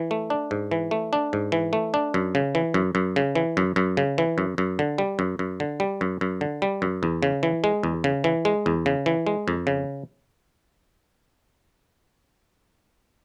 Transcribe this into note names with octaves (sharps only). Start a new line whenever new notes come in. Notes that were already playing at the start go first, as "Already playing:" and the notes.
Already playing: E3
A3
D4
G#2
E3
A3
D4
G#2
E3
A3
D4
F#2
C#3
E3
F#2
F#2
C#3
E3
F#2
F#2
C#3
E3
F#2
F#2
D3
G3
F#2
F#2
D3
G3
F#2
F#2
D3
G3
F#2
E2
C#3
E3
G#3
E2
C#3
E3
G#3
E2
C#3
E3
G#3
F2
C#3